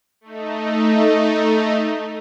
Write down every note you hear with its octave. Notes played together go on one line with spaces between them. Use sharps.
A3 D#4